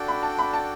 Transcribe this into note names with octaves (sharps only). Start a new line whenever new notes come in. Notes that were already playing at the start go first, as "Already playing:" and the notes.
Already playing: D4 F#4 A4 D5 G5
B5
A5
B5
A5